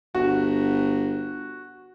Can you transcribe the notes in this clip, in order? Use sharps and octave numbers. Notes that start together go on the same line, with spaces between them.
G1 F#4